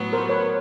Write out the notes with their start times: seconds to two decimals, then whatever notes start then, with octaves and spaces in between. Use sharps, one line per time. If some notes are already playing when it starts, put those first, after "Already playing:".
Already playing: A2 F#3 B3
0.13 A#4 C5
0.29 B4 C#5